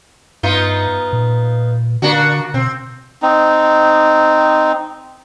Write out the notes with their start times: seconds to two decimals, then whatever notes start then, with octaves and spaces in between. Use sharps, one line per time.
0.43 G2 B3 D#4 F4
1.13 A#2
2.02 D3 A#3 D4 F#4
2.54 B2 C4
3.22 C4 D#4